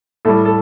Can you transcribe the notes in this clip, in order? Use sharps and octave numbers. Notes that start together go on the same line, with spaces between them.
A2 G3 A4
A4